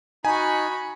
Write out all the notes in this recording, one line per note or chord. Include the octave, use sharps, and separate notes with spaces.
D#4 F#4 G#5 B5